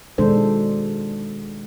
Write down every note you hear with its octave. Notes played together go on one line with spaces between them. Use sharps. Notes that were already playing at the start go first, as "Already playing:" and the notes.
B2 D#3 G#3 D4 A4 C5